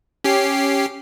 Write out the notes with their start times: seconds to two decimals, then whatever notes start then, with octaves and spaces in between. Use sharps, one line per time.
0.24 C#4 G4 C7